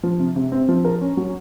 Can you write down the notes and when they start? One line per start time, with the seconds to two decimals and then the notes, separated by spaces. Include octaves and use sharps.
0.03 F3
0.19 C3
0.36 C3
0.52 C4
0.69 F3
0.85 A#4
1.01 C#4
1.17 F#3